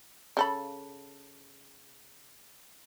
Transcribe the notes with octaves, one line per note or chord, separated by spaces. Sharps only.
C#3 A4 B5